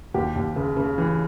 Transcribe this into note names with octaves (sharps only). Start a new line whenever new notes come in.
D#2 G4
D#2
C#3
C#3
E3